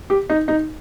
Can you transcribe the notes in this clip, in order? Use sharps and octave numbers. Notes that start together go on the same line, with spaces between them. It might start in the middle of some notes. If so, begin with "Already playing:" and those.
G4
D#4
D#4